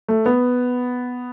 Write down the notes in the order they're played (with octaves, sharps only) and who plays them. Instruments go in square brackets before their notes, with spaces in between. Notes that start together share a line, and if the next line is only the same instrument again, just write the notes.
[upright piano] A3
B3